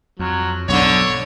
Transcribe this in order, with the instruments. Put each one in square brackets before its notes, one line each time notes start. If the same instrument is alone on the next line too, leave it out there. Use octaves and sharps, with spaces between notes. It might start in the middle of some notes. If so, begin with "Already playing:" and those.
[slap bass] F2 [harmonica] F#3
[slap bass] B1 G#2 [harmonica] D3 [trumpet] C#5